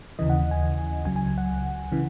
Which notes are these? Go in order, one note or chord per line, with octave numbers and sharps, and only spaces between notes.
D#2 C#3 E3 D#5
F#5
G#5
C#2 C#3 F#3 G#5
G#5
F#5
C#3 E3